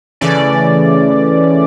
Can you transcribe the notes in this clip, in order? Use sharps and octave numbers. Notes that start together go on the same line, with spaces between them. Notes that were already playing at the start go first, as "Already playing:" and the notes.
C#3 E3 A3 C#4 D5